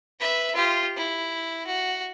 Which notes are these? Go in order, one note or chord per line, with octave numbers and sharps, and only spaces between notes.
B4 E5
F4 G4
E4
F#4